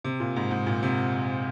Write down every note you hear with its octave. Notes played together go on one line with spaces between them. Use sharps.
C3
A#2
G#2
G#2
A#2
C3